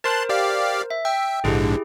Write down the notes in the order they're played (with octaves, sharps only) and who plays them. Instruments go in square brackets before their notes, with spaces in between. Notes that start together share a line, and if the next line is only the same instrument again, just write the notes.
[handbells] A#4 C5 [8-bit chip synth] A5 C6 F#6
[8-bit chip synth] G4 D5 F5
[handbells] E5
[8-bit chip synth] E5 [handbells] G5
[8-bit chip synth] A#1 G#2 D3 [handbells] E4 G4 G#4